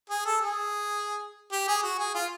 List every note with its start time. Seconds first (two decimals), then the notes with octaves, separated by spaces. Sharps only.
0.10 G#4
0.26 A4
0.41 G#4
1.52 G4
1.68 G#4
1.83 F#4
1.99 G#4
2.15 F4